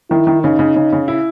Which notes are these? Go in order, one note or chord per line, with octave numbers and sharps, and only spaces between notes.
D#3 E4
D#3
C#3 D#4
C#3
C#3
C#3
E4